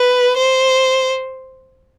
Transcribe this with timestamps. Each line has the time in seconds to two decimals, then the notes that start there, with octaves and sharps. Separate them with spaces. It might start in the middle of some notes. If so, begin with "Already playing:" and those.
Already playing: B4
0.37 C5